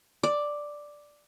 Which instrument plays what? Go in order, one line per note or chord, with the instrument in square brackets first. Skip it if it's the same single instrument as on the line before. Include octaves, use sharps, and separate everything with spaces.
[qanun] D5